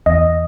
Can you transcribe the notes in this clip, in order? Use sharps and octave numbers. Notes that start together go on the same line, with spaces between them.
E2 D#5